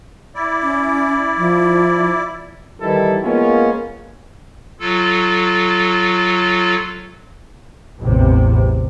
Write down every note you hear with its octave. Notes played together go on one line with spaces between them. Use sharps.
E4 D5
C#4
F3
D#3 E3 G3 E4 A4
G#3 A#3 B3 C#4 F4
F#3 F4 A4
A1 E2 C3